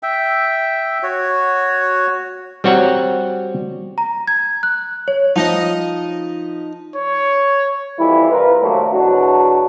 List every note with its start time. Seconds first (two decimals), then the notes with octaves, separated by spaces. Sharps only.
0.03 E5 G5
1.03 F#4 C#5
2.64 G3 C4 F#4 C#5 F#5
3.98 A#5
4.28 G#6
4.63 F#6
5.08 C#5
5.36 F3 D#4 D#5
6.95 C#5
7.99 F2 E3 G3 E4
8.31 C2 F4 A#4 B4
8.62 D#2 A#2 F3 F#3 A3 A#3
8.93 E2 B2 F#3 D4 F#4